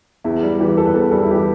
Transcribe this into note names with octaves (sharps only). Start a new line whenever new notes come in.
E2 E4
G3
E3 G4
E2 A4
B4
E2 A4
B4
G3 A4
E4
E3 G4